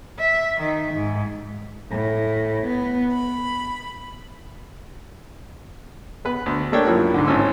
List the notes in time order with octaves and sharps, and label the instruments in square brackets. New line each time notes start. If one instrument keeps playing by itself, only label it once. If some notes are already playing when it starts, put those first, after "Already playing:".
[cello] E5
D#3
G#2
[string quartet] A2
B3
B5
[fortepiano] B3 B4
D2
A3 A#3 D4 C#5 G5
F#2 F3 A#3 E4
G#2 D3
G#1 A2 C#4 E6